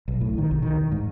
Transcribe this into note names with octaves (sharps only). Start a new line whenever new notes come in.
B1
A2
D#3
B1
D#3
E2
G#2